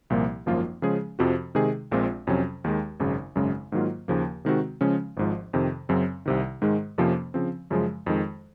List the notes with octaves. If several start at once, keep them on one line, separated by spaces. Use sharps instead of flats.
C2 A#2 F3 A#3
G#1 F#2 F3 A#3 F4
C#3 F3 G#3 C#4 G#4
F2 C3 F3 C4 F#4
C3 D#3 G#3 D#4 G#4
A#1 A#2 G#3 C4 F4
F2 C3 F#3 C#4
D#2 D#3 G#3
G#1 F#2 C#3
G#1 F#2 C#3 G#3
G#2 D#3 F#3 A#3 F4
D#2 C#3 F3 A#3
C3 D#3 G#3 C4 F#4
C#3 F3 G#3 C#4
G#1 G#2 F3
F2 C3 D#3
F#2 C#3 F#3 C4
C2 C3 D#3
G#2 D#3 G#3
F2 C3 F3 A#3 C#4
C#3 F3 C4
F#2 C#3 F3 G#3
F2 D#3 G#3